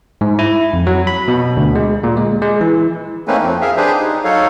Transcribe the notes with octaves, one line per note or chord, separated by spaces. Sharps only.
G#2
E4
F2
F#3
B5
B2
D2
G#3
A#2
G#3
G#3
E3
A3 A#3 C4 C#4 D#4 B4
F2 F3 C4
G#4 A#4 E5 F5
D4 G4 G#4 B4 C5
D#4
F#3 D#4 A4 C#5 F5